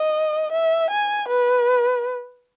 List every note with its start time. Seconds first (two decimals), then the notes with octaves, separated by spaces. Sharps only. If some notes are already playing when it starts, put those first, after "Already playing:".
Already playing: D#5
0.52 E5
0.90 G#5
1.28 B4